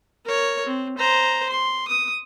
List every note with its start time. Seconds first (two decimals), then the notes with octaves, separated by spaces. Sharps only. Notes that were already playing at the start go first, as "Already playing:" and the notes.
0.25 A#4 C#5
0.66 C4
0.98 C5 A#5
1.49 C6
1.88 D#6